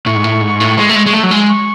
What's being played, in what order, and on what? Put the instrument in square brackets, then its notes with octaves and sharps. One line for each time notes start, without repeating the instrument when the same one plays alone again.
[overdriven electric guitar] A2 [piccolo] C#6
[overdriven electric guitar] G#2
A2
G#2
A2
G#3
A3
G#3
G#3
A3
F#3
G#3
[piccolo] C#6